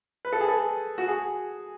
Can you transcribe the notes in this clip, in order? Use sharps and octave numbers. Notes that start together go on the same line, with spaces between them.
B4
A4
G#4
A4
F#4
G#4